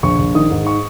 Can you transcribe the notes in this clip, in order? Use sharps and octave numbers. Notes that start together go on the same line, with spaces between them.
A#1 C#6
A#1
D#3 D#6
G#2
C#6